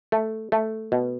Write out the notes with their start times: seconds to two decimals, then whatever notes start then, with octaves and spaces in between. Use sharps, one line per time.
0.12 A3
0.52 A3
0.92 B2